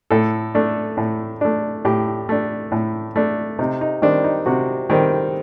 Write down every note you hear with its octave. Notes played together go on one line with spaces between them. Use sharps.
A2 A4
A3 D4
A2
A3 D4
A2 G4
A3 D4
A2
A3 D4
C3 D#4
D#4
D#3 G3 C4 D4
D#4
C3 F#4
D#3 G3 C4